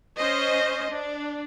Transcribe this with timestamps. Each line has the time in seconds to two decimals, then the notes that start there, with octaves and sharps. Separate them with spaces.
0.18 C#4 C5 D#5
0.91 D4